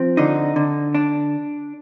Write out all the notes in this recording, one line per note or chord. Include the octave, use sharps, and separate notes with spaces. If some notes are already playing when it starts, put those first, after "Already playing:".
Already playing: F3 C4
D3 D#4
D3
D4